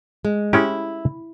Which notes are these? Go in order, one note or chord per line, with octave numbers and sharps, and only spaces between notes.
G#3
G#3 C#4 E4 G4